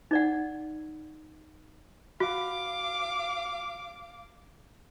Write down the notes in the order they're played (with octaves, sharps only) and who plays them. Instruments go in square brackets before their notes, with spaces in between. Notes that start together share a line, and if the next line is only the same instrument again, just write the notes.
[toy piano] D#4 D5 F#5
[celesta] F#4 [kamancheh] F5 D6